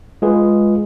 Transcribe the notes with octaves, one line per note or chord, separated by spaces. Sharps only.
G#3 F4 G#4 B4